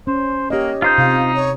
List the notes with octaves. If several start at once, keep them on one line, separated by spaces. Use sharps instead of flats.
C#4 C5
A#3 G4 C#5 D#5
D#4 F4 C5 G6
C3 F5
C#5